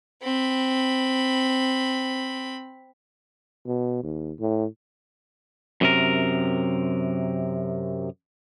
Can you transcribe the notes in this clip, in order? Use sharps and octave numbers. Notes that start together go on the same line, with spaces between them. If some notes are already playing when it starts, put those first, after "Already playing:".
C4 B5
B2
D#2
A2
F#2 C3 A#4